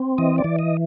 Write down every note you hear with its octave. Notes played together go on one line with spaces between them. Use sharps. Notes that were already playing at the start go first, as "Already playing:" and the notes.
Already playing: C4
E3 D#5
D5
E3
D#5